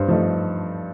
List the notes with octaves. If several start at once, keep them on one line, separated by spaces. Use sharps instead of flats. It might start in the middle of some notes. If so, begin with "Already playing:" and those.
Already playing: G2 C5
F3 A3 D#4